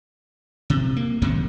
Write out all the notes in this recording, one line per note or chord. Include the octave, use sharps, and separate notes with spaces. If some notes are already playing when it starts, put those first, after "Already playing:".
C3
A#3
F#2 C3 D#3 F#3